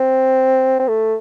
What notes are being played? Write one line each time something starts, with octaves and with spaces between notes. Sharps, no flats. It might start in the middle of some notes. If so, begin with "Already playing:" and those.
Already playing: C4
C4
A3